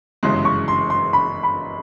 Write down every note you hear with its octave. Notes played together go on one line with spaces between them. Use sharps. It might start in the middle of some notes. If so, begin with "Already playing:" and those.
G1 F#2 C#3 E3 G#3 C6
C#6
C6
C6
B5
B5